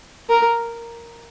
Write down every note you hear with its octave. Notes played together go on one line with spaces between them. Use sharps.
A#4